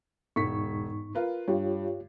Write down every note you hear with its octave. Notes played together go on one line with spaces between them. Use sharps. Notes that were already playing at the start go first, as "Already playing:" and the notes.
E1 G#2 D#4 C#6 B6
F4 A#4 B4
G2 F4 G4 C#5